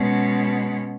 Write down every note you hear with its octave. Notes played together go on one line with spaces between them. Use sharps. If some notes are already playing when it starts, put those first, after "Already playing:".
Already playing: B2 G#3 C#4